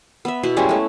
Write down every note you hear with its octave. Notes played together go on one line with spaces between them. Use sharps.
B3 E5
B2 E4 B4
G3 G#3 C#4 E4
A3 C#4